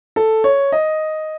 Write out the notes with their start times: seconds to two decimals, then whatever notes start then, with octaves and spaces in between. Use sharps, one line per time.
0.16 A4
0.44 C#5
0.72 D#5